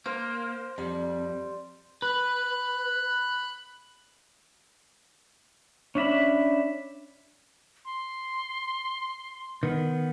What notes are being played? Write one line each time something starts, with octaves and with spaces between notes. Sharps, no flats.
A#3 C5
F2 G3
B4 B5 F#6
C#4 D4 E5 B5
C6
D#3 B3